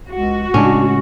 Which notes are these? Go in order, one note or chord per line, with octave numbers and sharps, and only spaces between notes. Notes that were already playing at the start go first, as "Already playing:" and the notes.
C#2 F#4
A2 C#3 G#3 C#4 D4